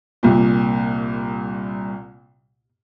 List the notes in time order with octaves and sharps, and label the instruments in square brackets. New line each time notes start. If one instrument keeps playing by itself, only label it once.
[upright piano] C2 A#2